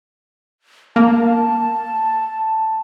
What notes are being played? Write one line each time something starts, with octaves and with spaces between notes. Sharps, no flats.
A#3 A5